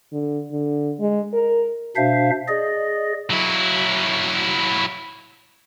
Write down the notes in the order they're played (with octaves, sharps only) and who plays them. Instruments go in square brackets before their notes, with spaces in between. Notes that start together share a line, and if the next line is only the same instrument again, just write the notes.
[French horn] D3
D3
G#3
A#4
[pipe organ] B2 D4 C5 E5 F5
G#4 D5 D#5
[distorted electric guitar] F#3 E4